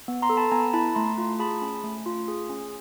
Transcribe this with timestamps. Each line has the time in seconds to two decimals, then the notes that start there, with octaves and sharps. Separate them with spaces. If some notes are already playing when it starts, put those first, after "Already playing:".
0.08 B3
0.22 A#5 C6
0.30 A4
0.37 A5 B5
0.52 B3 G#5 A#5
0.74 E4 A5 B5
0.95 A3 A#5 C6
1.18 F4
1.39 G#4 A5 B5
1.62 C#4
1.84 A3
2.06 F4
2.28 G#4
2.50 C#4